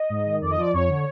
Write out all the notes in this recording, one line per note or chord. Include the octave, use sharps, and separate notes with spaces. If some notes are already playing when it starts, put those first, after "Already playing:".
Already playing: D#5
G#2
D#3
F2 D5
D#5
F3 D5
F2 C#5
D3